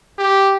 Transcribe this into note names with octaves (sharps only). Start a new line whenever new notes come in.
G4